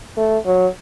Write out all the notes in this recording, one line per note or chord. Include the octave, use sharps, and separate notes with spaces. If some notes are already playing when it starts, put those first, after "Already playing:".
A3
F#3